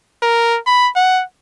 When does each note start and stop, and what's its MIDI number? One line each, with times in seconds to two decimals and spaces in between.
0.22 0.58 70
0.67 0.89 83
0.96 1.23 78